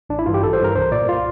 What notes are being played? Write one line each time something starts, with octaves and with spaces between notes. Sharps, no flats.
A1 D4
E4
G2 E3 F4
G4
A1 A4
C5
G2 E3 A#4
C2 C5
A#2 D5
F4